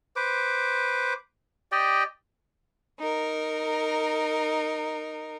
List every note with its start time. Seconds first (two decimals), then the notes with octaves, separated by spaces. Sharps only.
0.16 B4 C5 D6
1.72 G4 D5 D#5 G5
2.99 D#4 A#4